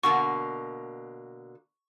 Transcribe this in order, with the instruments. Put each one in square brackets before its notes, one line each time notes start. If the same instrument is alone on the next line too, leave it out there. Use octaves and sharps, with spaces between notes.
[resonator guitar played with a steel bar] B2 D3 A#3 [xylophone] C#6